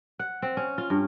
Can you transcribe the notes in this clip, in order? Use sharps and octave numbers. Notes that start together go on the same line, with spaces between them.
F#5
C4
C#4
F4
G2